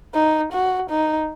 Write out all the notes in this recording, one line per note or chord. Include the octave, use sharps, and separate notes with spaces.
D#4
F#4
D#4